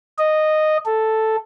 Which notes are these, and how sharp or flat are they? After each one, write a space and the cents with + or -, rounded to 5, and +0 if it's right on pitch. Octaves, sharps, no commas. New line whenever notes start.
D#5 -10
A4 +0